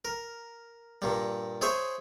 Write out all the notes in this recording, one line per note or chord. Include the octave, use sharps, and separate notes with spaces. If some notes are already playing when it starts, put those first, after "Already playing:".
A#4
G2 A#2 G3
E4 G#4 C5 C#5 E5